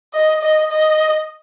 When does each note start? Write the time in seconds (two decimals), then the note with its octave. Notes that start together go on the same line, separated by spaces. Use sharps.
0.14 D#5
0.42 D#5
0.70 D#5